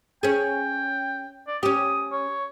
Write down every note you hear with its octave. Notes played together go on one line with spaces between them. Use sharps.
C#4 G#4 G5
D5
C#4 G4 D#6
C#5